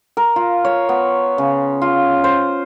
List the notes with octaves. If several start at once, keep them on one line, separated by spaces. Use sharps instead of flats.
A#4
F4
C#5
B3
C#3
F4
C5